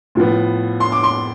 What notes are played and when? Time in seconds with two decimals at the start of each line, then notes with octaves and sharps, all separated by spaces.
0.15 A2 F3 B3
0.80 C6
0.92 D6
1.03 C6